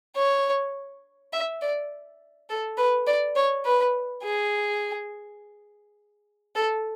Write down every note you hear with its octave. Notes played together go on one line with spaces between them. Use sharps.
C#5
E5
D5
A4
B4
D5
C#5
B4
G#4
A4